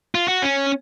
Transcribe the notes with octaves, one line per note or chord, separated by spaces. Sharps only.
F4
F#4
C#4